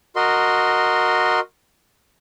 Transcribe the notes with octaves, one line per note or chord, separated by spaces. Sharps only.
F#4 A#4 D#5 C6